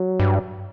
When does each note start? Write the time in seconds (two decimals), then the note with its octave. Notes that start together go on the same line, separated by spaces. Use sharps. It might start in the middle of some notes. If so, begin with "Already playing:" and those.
Already playing: F#3
0.20 G2